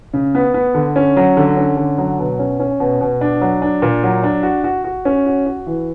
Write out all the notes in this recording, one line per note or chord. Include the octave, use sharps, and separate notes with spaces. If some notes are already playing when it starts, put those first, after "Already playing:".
C#3
B3
B3
D3
C#4
F#3
D3
C#4
D3
F#3
B2
C#4
C#4
B2
B2
D4
F#3
D4
A#2
F#3
D4
F#4
F#4
F#4
C#4
F#4
F#4
E3